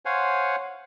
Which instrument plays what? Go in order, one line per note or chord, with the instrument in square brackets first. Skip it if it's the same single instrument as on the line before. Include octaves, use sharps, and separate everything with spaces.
[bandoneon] C5 C#5 F5 F#5 G#5